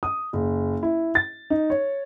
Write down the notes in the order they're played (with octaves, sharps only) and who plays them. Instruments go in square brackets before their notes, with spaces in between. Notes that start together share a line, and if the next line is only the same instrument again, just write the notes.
[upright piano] D#6
F#1
E4
A6
D#4
C#5